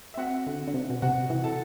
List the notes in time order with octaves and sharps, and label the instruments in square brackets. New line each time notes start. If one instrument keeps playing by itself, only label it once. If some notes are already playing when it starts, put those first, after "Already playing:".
[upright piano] E5
[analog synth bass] C4 [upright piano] F#4 F#5
[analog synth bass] D3
D3
C3
B2
[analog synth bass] C3 [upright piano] F#4 F#5
[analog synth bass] E3
[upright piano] A4 A5